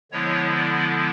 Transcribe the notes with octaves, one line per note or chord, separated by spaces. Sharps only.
D3 F3 G#3 B3 E4 C#5
D5